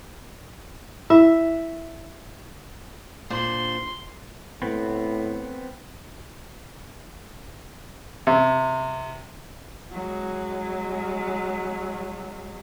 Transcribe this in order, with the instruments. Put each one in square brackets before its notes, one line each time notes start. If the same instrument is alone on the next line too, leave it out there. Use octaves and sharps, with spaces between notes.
[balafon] E4 [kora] E5
[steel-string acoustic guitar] A#2 D4 C5 [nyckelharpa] C6
[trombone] A2 [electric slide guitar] B3 C4
[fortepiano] C3
[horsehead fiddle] F#3 G#3